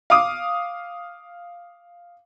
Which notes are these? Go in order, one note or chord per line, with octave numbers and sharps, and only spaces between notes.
F5 D6 D#6